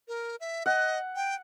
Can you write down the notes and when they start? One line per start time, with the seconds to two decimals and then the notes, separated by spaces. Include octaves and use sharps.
0.08 A#4
0.40 E5
0.66 D#5 F#5
1.16 G5